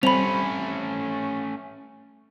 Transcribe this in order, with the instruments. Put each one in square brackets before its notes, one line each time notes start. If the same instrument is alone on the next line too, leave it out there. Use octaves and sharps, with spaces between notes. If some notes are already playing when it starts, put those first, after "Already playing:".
[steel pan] G3 C4 [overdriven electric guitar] A3 C#4 [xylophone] B5 F7